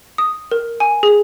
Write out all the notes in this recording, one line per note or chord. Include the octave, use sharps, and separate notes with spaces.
D#6
A#4
G#5
G#4